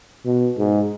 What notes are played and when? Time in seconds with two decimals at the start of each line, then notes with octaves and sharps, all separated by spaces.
0.25 B2
0.58 G#2